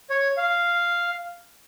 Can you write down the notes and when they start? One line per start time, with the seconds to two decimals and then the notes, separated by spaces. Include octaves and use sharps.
0.10 C#5
0.37 F5